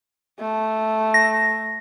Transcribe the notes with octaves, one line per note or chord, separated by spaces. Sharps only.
A3
A#6